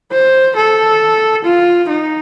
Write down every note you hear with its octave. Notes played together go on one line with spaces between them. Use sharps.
C5
A4
F4
D#4